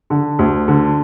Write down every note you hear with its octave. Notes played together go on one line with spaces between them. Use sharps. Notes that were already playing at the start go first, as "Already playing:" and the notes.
D3
D2
D3